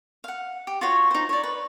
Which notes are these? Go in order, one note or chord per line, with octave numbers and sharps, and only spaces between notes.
F5 F#5
G4
F4 F#4 C#5
D#4 C5
C#5 D5
B4